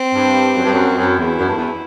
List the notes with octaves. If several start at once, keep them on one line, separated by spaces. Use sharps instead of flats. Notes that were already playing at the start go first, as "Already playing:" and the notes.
Already playing: C4
G2
F#2
G2
F#2
F#2 E4
E2
F#2
G2
E2